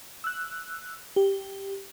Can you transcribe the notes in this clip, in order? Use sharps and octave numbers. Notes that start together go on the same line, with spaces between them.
E6 F#6
G4